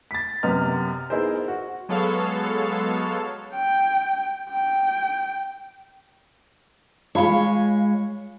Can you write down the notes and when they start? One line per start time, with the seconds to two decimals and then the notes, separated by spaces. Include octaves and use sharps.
0.11 A6 B6
0.43 F#2 C3 B3 D#5 F6
1.10 B3 D#4 E4 G#4 A#4 C5
1.48 F#4
1.89 F#3 G#3 B3 A4 C#5 F5
3.54 G5
4.51 G5
7.15 G#3 F4 C#5 F5 B5